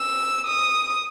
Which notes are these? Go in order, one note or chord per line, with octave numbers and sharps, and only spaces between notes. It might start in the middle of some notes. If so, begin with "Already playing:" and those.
Already playing: E6
D#6